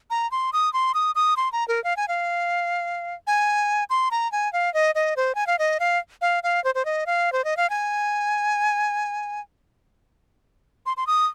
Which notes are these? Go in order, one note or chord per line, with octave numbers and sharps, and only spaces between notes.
A#5
C6
D#6
C6
D#6
D#6
C6
A#5
A#4
F5
G#5
F5
G#5
C6
A#5
G#5
F5
D#5
D#5
C5
G#5
F5
D#5
F5
F5
F5
C5
C5
D#5
F5
C5
D#5
F5
G#5
C6
C6
D#6